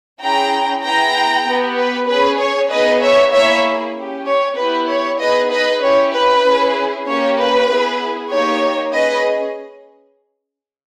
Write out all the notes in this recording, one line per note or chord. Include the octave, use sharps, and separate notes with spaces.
C#4 E4 G#4 G5 A#5
B3 E4 G#4 G5 A#5
B3 G4
B4
C#4 G#4 B4
C#5
B3 D#4 G#4 B4 D#5
C#5 E5
A#3 E4 G#4 C#5 E5
C#4 G4
C#5
B3 E4 G4 B4
C#5
B3 D#4 G#4 B4 D#5
B4 D#5
C#4 E4 G4 C#5
B4
C#4 E4 G#4
A#3 C#4 G4 C#5
B4
B3 E4 G#4
A#3 D#4 G4 C#5
C#4 G#4 B4 D#5